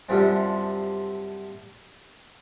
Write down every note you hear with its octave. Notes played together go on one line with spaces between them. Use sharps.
F#2 C3 F3 G3 C4 D4